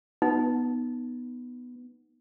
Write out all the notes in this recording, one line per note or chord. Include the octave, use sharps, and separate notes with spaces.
B3 D#4